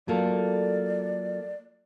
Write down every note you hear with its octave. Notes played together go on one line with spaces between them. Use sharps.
F#3 A3 A#3 F4 A4 D5